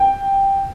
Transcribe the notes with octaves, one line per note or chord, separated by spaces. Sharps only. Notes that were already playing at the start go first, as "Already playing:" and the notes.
Already playing: G5